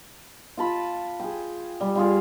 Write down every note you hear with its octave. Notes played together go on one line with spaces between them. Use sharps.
F4 A5 B5
G#4 G5
G3
G3 F4 G#4